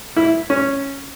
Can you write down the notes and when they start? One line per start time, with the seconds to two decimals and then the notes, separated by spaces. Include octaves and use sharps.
0.16 E4
0.50 C#4